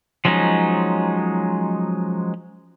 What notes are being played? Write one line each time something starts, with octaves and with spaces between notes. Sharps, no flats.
F3 F#3 G#3 C#4 D#4